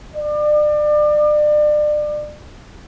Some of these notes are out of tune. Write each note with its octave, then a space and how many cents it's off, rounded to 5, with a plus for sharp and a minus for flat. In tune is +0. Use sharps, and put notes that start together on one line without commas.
D5 +30